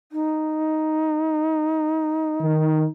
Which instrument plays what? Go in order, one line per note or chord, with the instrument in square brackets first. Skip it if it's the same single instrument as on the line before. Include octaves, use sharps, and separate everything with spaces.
[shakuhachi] D#4
[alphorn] D#3